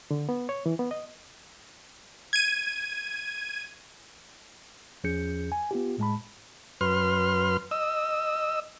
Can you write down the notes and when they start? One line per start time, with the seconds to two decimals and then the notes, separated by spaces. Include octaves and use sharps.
0.11 D3
0.29 B3
0.49 C#5
0.66 E3
0.79 B3
0.91 D#5
2.33 G#6 D#7
5.04 E2 F3 C#4 G#4 G6 C#7
5.52 G#5
5.71 B3 F4 G4
5.98 A2 G#3 A5 B5
6.81 F#2 B4 C6 F6
7.71 D#5 E6